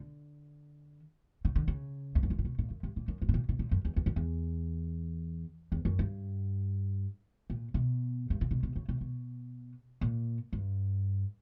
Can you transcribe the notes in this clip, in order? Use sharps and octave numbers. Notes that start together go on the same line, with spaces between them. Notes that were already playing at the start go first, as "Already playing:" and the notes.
Already playing: D3
C#3
D3
C#3
E2
F#2
G2
A#2
B2
A#2
F#2
G2
A#2
F#2
G2
B2
A#2
B2
A#2
F#2
E2
E2
F#2
E2
E2
F#2
G2
A#2
B2
G2
A#2
B2
B2
C#3
B2
B2
A#2
G2